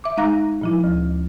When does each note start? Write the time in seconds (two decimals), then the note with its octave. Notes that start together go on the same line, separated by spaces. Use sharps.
0.04 E5 D6
0.17 G#3 D#4 F5 A#5 F#6 A#6
0.61 A#2 F3 E4
0.84 D2